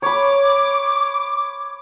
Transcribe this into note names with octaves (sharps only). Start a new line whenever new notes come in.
C#5 B5 D6